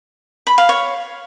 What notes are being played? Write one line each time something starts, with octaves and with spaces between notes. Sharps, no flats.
B5
F5
C#5